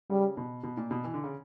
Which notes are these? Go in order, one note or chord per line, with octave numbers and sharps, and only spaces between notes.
C#3 G3
B2
B2
A#2
B2
E3
D3
C#3